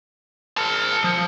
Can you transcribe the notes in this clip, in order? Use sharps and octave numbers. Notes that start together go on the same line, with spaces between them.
A#4 A5
F3